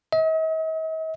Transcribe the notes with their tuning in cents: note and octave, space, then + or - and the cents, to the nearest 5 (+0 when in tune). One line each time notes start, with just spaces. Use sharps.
D#5 +45